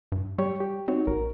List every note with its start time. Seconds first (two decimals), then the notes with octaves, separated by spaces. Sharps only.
0.12 G2
0.38 G3 G4 C#5 C#6
0.60 G4
0.88 C4 D#4 F#4 C#5
1.07 A#1 A#4